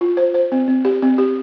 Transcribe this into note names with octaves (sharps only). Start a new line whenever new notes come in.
F4
C5
C5
C4
C4
G4
C4
G4